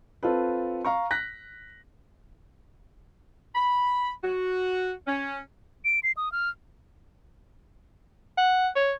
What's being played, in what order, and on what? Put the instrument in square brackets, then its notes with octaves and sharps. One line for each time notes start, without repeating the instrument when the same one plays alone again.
[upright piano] C4 F4 A4 B4
F5 A#5 C#6
F#6 A#6 B6
[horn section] B5
F#4
C#4
[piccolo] D7
C7
D#6
F6
[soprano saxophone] F#5
C#5